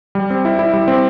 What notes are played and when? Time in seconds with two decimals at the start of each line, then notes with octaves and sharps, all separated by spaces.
0.15 G3
0.30 C4
0.45 E4
0.59 E4
0.73 G3
0.88 C4